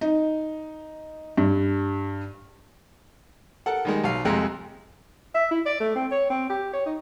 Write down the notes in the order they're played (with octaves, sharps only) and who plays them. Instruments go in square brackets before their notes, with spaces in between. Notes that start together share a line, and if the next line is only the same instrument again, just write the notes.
[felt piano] D#4
G2
[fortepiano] A4 A#4 F#5
D#3 G3 G#3
B1 F5
C2 F2 G#3 A#5
[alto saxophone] E5
E4
D5
A3
C4
C#5
C4
G4
C#5
D#4